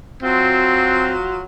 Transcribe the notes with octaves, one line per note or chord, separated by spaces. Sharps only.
F#3 C4 F4 F#4